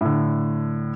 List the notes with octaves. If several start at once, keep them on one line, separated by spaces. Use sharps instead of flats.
A2 D3